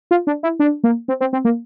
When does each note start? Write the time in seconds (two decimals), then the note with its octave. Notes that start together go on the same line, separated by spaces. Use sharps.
0.11 F4
0.27 D4
0.43 E4
0.59 D4
0.84 A#3
1.08 C4
1.20 C4
1.33 C4
1.45 A#3